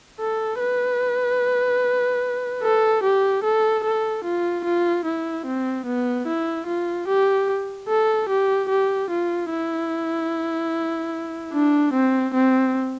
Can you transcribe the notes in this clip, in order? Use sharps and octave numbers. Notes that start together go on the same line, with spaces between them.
A4
B4
A4
G4
A4
A4
F4
F4
E4
C4
B3
E4
F4
G4
A4
G4
G4
F4
E4
D4
C4
C4